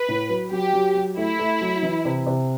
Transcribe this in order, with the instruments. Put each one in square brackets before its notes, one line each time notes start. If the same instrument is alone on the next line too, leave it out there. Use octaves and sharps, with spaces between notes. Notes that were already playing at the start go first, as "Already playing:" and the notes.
Already playing: [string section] B4
[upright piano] A2
F#3
[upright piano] F#3 [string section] G4
[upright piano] F#3
F#3
[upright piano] A3 [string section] E4
[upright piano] A3
F#3
E3
C3
C3